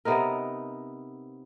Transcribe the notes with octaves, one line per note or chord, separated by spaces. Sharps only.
C3 B3 D#4 A#4